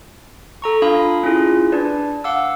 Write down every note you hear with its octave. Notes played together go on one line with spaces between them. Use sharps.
A4 A#5 C#6
D4 F4 F5 B5 D#6
C#4 E4 F4 G#4
D4 B4 D5
F5 F#5 D6 E6